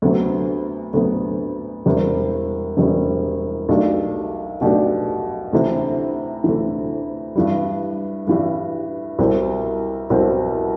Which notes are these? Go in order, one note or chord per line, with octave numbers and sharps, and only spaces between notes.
D2 C3 F#3 B3
D2 C3 F#3 B3
E1 E2 C3 G3
E1 E2 C3 G3
B1 B2 A3 D4 G4
B1 B2 A3 D4 G4
D2 C3 E3
D2 C3 E3
G2 E3 G3
G2 E3 G3
C2 B2 G3 C4
C2 B2 G3 C4